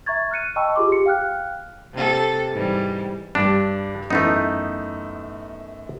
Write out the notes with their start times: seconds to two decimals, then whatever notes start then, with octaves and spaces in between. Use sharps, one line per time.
0.06 E5 A#5 C#6 G#6 A6
0.31 F6 F#6 C#7 D#7
0.56 D#5 G5 A5 B5 C#6 E6
0.76 F4 G4 G#4 C6 D6
0.92 G4 C#7
1.06 F5 G5 F6 F#6
1.94 C3 A4
2.52 G#2 E3 G3
3.35 G2 G3 D4
4.10 F#2 E3 A3 B3 D#4